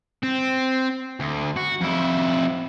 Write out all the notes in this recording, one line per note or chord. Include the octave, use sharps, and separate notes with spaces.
C4
D2
F#4
F2 E4